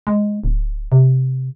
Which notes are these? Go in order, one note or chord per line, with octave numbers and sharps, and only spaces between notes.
G#3
D1
C3